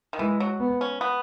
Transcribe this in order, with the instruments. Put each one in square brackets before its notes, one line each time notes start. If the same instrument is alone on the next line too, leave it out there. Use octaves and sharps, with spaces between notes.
[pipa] D#3
[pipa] E3 [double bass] G#3
[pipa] F#3
[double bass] B3
[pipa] C#4
B3